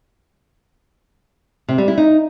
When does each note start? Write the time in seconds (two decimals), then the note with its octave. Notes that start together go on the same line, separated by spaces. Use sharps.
1.68 C3
1.78 G3
1.88 E4
1.97 D#4